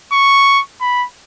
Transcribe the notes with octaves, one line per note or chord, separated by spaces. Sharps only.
C#6
B5